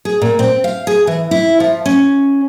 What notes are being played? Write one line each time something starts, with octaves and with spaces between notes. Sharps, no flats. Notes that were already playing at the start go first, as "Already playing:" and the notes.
G#4
A#2
C4
F5
G#4
E3
E4
F3
C#4